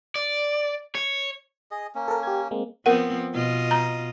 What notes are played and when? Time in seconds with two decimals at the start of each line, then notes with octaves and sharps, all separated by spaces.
0.16 D5
0.95 C#5
1.71 G#4 D#5
1.95 A#3 C#4
2.08 A4 A#4
2.23 G4 G#6
2.51 G#3 A#3 C4
2.86 F3 B3 C4 A#4 F#5
3.33 B2 F4 D#5
3.71 A#5